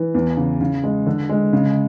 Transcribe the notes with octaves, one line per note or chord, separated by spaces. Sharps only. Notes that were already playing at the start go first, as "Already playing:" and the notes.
Already playing: E3
E2
C#3
C#3
G#3
D3
G#3
C#3